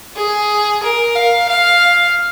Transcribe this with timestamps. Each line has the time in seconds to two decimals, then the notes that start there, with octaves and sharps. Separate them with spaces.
0.16 G#4
0.83 A#4
1.15 F5
1.49 F5